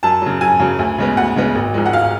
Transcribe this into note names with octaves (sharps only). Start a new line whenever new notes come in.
F#2 A5
C#3 F#3
F#2 G#5
C#3 F#3
D2
C#3 G#3 B3
D2 F#5
C#3 G#3 B3
G#1
G#2 F3 G#3
F#5
G#1 F5